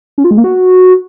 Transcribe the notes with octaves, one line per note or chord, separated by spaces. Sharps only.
C#4
F4
G#3
A#3
F#4